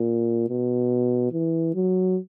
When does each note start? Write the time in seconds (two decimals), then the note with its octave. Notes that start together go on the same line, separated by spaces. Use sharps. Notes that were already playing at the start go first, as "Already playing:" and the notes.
Already playing: A#2
0.49 B2
1.33 E3
1.74 F#3